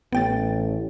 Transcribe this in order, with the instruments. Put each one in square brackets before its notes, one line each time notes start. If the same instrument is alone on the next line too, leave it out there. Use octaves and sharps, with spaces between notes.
[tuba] A1 [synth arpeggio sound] B3 G5 A6